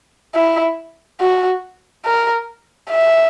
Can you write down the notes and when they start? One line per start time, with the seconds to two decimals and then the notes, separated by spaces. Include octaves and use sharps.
0.35 E4
1.21 F#4
2.05 A#4
2.90 E5